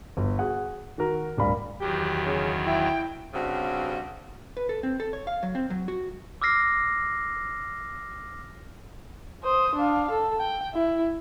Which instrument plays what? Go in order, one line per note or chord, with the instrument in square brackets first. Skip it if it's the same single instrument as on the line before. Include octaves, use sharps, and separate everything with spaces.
[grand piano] G1
F#4 G#4 F#5
D#3 F#4 A#4
D1 G2 G3 A#4 F5 B5
[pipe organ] E2 D#3 F#3 [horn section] G4
[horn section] C#3
[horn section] E4 [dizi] G5
[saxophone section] G2 C#3 G3 C4 F#4
[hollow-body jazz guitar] B4
A4
C4
A4
C#5
F5
F#3
C4
F#3
F#4
[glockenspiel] D6 E6 F6 A#6 C7
[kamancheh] C5 D#6
D4 F5
A4
G5
E4